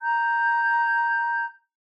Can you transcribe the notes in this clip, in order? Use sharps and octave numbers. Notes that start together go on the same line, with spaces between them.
A#5 G6